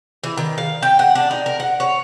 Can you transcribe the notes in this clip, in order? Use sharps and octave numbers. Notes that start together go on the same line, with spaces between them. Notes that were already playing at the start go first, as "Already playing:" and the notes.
E3
D#3
F5
G5
F#5
D4
D#4
A#4
F#5
C#5